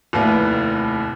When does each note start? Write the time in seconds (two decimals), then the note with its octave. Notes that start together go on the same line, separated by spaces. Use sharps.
0.13 F1 D#2 A2 E4 B4 F5